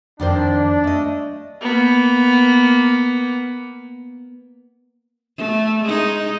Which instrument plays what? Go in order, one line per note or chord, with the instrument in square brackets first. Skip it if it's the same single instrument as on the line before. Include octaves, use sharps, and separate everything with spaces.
[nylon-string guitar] F2 D#3 C5 [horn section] D4
[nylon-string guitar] A3 D#5
[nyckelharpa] A#3 B3
[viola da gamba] A3
G#3 D#4